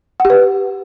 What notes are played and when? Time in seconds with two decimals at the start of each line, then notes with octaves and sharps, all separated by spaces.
0.20 F#5
0.25 G4
0.30 B4